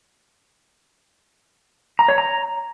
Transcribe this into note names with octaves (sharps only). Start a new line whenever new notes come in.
A#5
C#5
A#5